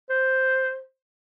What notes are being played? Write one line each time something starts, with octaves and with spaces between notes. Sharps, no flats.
C5